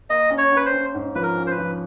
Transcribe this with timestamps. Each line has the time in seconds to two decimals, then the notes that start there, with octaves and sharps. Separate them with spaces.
0.10 A#3 D#5
0.30 C#4
0.38 C#5
0.52 C#4 B4
0.66 C5
0.73 C#4
0.95 G#2
1.15 F3 B4
1.23 A#4
1.37 C#4
1.47 C5
1.51 B4
1.58 F3